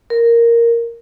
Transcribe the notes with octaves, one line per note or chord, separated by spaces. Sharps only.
A#4